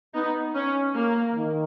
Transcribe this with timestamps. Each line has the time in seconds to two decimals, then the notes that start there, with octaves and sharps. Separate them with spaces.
0.14 B3 D#4
0.54 C#4
0.95 A#3
1.35 D#3